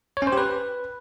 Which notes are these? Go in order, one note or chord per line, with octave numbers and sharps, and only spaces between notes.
C#5
C#4
C5
G4
B4